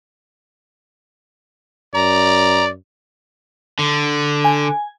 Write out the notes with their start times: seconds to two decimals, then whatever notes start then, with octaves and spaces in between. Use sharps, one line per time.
1.94 F#2 D5 A#5
3.79 D3
4.45 G#5